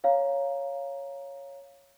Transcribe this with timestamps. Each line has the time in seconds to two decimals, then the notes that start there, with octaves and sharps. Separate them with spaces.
0.04 C#5 F5 A#5